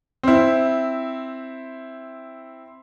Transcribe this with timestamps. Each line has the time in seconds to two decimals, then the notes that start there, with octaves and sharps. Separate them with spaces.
0.23 C4 E4